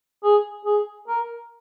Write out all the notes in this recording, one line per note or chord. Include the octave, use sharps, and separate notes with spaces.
G#4
G#4
A#4